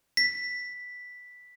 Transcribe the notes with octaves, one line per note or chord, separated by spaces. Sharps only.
B6